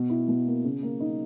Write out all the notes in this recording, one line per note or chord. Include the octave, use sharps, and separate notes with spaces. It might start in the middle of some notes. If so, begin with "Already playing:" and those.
Already playing: B2
E4
B2
A#3
C#3
A#3
D#4